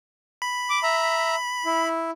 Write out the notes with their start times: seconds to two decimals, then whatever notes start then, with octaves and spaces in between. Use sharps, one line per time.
0.42 B5
0.70 D6
0.83 E5 A#5
1.65 E4